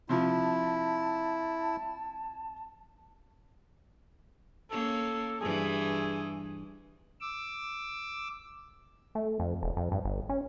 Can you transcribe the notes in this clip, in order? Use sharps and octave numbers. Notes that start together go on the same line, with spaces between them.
C3 F3 E4 A5
A#3 C#4 A4
G2 E3 G#4
D6 E6
A3
F2
E1
F2
G2
G1
C#4